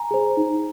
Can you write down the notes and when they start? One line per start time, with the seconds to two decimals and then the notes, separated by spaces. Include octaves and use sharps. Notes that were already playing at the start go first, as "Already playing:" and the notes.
Already playing: G#5 A#5
0.11 G#4 C5
0.37 D#4